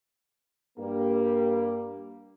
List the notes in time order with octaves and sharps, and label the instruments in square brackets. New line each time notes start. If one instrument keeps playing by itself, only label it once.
[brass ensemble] G2 G3 A#3